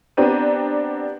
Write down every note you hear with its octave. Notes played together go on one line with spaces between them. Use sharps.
B3 C4 D4 G4 A#5 D#7